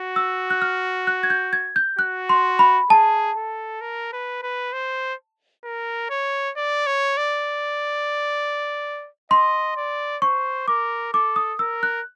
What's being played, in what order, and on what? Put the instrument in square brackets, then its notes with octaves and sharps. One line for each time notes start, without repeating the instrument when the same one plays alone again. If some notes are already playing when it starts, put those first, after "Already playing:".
Already playing: [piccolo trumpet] F#4
[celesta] E6
F#6
F6
F#6
G#6
G6
G#6
G6
[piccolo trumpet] F#4 [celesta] F#6
[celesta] C6
B5
[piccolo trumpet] G#4 [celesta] A5
[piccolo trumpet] A4
A#4
B4
B4
C5
A#4
C#5
D5
C#5
D5
[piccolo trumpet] D#5 [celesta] C6
[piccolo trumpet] D5
[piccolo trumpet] C5 [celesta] C#6
[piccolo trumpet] A#4 [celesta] D6
[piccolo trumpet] A4 [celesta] D6
[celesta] D#6
[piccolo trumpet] A#4 [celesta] E6
[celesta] F#6